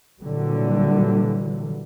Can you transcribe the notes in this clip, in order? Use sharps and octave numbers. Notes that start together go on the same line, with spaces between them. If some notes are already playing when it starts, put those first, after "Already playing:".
A#2 D3 E3 F#3 G3